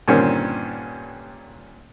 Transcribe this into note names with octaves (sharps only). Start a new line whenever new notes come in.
G2 A#2 D3 D#3 C4 C#4